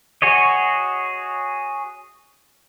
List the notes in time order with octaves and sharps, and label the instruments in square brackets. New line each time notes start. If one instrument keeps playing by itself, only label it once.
[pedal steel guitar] F#4 G#4 C#5 D#5